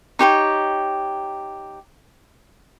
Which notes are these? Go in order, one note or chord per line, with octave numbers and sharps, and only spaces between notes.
D#4 G4 C5 C#5